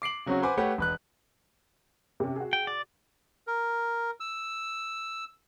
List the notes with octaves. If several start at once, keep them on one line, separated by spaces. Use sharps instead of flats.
D6 C7 D7 F#7
C#3 F#3 C4 C#4 F#4
B4 C5 F#5 G#5 B5 D6
A3 G4 B4 C#5 F#5
E1 B4 F#6
C3 C#4
F#4 G#4
G5
D5
A#4
E6